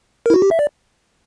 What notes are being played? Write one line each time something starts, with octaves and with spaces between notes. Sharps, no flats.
A#4
E4
F#4
G4
E5
D5